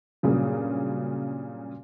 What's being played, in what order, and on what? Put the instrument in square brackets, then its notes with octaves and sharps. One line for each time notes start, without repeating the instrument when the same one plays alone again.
[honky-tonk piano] G2 A#2 C#3 F#3